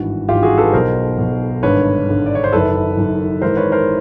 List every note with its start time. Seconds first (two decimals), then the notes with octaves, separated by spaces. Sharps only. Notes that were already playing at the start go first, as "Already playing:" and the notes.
Already playing: G#1 G2 E3 F#4
0.29 G#1 G2 E3 F4 G4
0.43 F#4 G#4
0.58 A4 B4
0.73 B1 B2 A#4 C5
1.18 B1 B2
1.63 G#1 G2 D3 B4 C#5
2.07 G#1 G2 D3
2.26 D5
2.35 C#5
2.44 C5
2.52 F#1 F#2 D#3 A4 B4
2.97 F#1 F#2 D#3
3.42 G#1 G#2 E3 A#4 C5
3.57 B4 C#5
3.72 A#4 C5